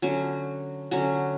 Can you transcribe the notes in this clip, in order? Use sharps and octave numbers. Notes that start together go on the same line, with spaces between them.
D3 F#3 C#4 F#4
D3 F#3 C#4 F#4